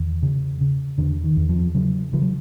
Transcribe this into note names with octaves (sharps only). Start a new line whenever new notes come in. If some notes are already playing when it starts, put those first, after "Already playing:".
Already playing: E2 D#3
C#3
C#3
E2 D3
D#3
E2
F3
C#3 F#3
C#3 F3
F#3